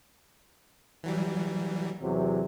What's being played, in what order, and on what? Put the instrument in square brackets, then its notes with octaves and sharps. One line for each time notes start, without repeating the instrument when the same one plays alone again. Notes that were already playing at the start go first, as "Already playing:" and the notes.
[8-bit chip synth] E3 F#3 G3
[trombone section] E2 C3 F#3